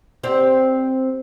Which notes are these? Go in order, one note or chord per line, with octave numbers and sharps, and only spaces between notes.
C4 G4 D5